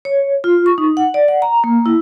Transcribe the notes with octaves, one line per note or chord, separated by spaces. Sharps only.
C#5
F4
C#6
D#4
F#5
D5
F#5
A#5
A#3
E4